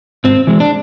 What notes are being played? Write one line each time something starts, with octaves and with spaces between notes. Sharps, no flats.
G#2 C4
E3 G#3
D4